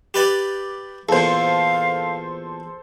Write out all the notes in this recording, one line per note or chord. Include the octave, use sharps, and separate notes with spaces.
G4 B4 D5
E2 A#2 A4 C5 F5